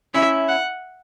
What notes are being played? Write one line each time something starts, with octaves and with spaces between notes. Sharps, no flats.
C#4 E4 E5
F#5